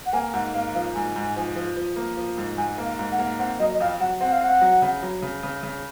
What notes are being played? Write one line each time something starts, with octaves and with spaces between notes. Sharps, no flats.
F#5
A#3 G#5
G#2 F#5
A#3 F5
F3 F5
G#2 G#5
G#2
F3
F3
F3
A#3
F3
G#2
G#2 G#5
A#3
F5
G#2
F#5
A#3
C4 F#5
F#3 D#5
D#5
F2 F5
F#3 F#5
C4 F#5
F5
C4 F#5
F#3
C#3
F#3
C#3
C#3
C#3